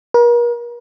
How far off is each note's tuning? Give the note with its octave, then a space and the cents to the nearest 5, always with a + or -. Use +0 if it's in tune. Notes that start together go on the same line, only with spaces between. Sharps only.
A#4 +40